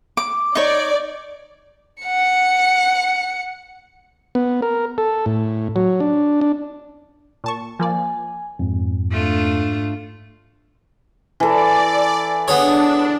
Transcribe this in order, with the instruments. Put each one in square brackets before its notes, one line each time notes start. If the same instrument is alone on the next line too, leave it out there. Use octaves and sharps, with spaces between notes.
[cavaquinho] D6
[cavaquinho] D#4 C#5 [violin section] D5
[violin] F#5 C#7
[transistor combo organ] B3
A#4
A4
A2
F#3
D4
D4
[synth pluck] A#2 A5 C#6
[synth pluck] F3 A#3 D5 [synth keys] G#5
[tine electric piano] F2 [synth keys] G#2
[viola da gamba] A3 D4 F4
[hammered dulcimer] E3 A4 [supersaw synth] D5
[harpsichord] B3 G#4 C#5 [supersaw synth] D4